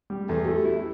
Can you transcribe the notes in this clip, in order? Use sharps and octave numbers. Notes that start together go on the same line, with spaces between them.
G3
E2 A4
A3 F#4
G4
E4